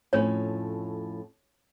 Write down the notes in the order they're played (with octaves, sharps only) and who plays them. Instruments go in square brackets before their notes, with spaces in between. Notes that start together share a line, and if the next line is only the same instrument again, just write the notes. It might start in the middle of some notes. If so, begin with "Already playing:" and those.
[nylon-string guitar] F2 A2 C#4 [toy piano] C#5